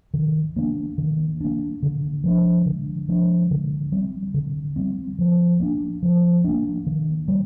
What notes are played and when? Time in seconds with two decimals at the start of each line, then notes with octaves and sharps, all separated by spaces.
0.14 D#3
0.56 A#3 D4
0.98 D#3
1.41 A#3 D4
1.83 D3
2.24 F3 G#3 D4
2.66 D3
3.09 F3 G#3 D4
3.51 D3
3.92 G3 C4
4.34 D3
4.76 G3 C4
5.19 F3
5.60 A#3 D4
6.03 F3
6.44 A#3 D4
6.86 D#3
7.28 G3